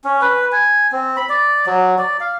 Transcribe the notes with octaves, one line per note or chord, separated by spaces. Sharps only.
C#4
B4
G#5
C4
B5
D5
F#3
D5
F5